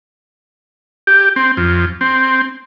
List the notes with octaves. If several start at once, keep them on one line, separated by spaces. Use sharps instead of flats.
G4
C4
F2
C4